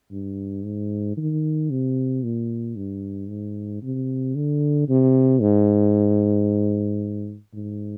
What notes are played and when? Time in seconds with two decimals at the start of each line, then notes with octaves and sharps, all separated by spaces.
0.11 G2
0.65 G#2
1.17 D#3
1.70 C3
2.23 A#2
2.76 G2
3.29 G#2
3.82 C3
4.36 D3
4.89 C3
5.41 G#2
7.54 G#2